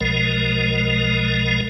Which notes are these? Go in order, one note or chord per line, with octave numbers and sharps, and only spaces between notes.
B1 B2 F3 G#3 A#4